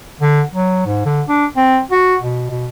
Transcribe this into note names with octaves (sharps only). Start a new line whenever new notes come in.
D3
F#3
G#2
D3
D4
C4
F#4
B2
B2